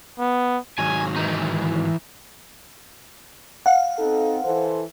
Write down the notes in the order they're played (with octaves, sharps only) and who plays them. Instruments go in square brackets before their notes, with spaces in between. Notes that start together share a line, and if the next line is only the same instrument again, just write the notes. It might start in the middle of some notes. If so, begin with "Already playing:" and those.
[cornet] B3
[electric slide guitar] G#2 D#3 F#3 [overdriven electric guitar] G#5
[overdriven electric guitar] E3 D#4
[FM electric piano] F5 F#5
[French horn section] C4 D#4 A4
E3 A4 C5